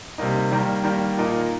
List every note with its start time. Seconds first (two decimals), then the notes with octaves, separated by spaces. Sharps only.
0.18 C3 G3 A#3 D#4
0.51 D#3 G3 A#3
0.84 D#3 G3 A#3
1.17 A#2 A#3 D#4